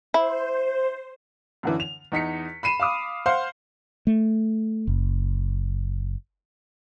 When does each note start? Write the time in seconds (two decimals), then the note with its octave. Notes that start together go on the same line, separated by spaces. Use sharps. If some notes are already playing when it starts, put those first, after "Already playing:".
0.14 E4 C5
1.63 F#2 D3 E3
1.80 F7
2.12 E2 D#4 B6 C#7
2.63 B5 C7 D#7 E7
2.80 F5 B5 D6 D#6 F6
3.26 C5 F5 F#5 C6
4.07 A3
4.87 F#1